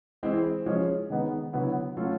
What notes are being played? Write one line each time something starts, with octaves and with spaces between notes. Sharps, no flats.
E3 G#3 C4 E4
F3 G#3 C#4
D#3 G#3 B3 D#4
D3 F#3 B3 E4
F#3 A3 C#4 F4 A4